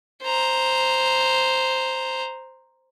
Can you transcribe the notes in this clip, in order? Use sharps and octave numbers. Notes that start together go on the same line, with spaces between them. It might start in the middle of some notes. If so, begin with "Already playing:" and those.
C5 A#5